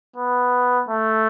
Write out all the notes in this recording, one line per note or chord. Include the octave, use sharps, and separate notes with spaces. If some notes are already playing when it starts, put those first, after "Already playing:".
B3
A3